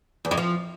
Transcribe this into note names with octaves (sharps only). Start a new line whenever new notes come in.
E2
F2
F3